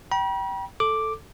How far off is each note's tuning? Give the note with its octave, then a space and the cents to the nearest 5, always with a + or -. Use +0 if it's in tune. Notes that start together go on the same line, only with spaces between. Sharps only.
G5 -15 B5 -45
A4 +0 D6 +0